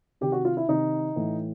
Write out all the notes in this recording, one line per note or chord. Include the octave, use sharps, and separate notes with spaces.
C3 D#3 G4
F#4
F4
E4
C3 D#3 D#4
A2 E3